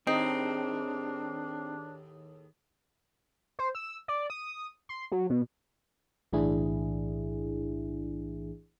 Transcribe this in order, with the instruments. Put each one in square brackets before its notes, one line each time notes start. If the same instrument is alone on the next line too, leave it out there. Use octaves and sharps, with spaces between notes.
[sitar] D#2 A2 G#4 [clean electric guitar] C4 [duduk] D4 [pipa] D#4
[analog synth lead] C5
E6
D5
D#6
C6
F#3
B2
[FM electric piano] B1 A2 E3 D4 E4 G#4